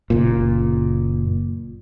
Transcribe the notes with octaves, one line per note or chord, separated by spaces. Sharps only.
F#1 A#2